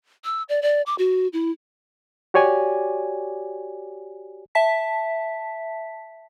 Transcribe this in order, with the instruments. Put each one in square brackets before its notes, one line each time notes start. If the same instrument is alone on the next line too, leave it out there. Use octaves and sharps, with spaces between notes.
[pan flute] E6
D5
D5
D6
F#4
E4
[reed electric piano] F#4 G4 C#5 D5 G#5
[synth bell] E5 A5 B6